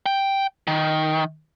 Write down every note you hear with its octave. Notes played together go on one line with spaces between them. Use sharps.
G5
D#3